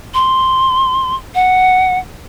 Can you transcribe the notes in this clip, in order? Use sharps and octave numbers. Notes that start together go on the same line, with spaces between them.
C6
F#5